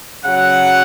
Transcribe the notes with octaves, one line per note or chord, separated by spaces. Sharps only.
C#3 F#3 F#5